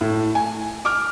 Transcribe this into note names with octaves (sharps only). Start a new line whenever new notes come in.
A2
G#5
D6 F6